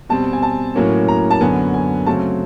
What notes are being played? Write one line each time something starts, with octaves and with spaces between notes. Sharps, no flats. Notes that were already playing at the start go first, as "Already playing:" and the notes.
B2 G3 C4 A5
G#5
A5
A2 F#3 A#3 C#4
A#5
A5
F#2 D3 F#3 B3 G#5
G#5
C#3 F#3 A3 C4 A5